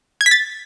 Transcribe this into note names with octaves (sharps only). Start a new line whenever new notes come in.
G#6
B6
A6